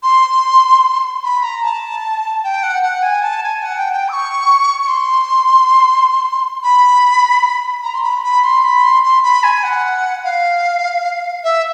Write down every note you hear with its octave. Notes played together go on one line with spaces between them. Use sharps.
C6
B5
A#5
A5
G5
F#5
F#5
G#5
A5
G#5
F#5
G5
G5
E6
C#6
C#6
C6
B5
A#5
C6
B5
B5
C6
B5
C6
C6
B5
G#5
F#5
F5
E5